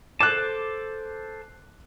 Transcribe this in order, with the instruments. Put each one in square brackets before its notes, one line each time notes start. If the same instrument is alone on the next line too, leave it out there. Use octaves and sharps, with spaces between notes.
[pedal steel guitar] A4 C5 A5 [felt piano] D6 F#6